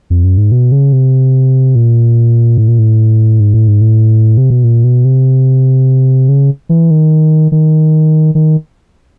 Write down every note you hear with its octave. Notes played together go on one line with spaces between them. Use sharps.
F2
F#2
G#2
B2
C#3
C3
A#2
A2
A#2
A2
G#2
A2
G#2
A2
C3
B2
A#2
B2
C3
C#3
E3
D#3
D#3
D#3